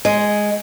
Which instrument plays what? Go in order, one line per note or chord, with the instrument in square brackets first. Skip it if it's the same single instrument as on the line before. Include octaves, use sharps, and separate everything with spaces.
[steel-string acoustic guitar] G#3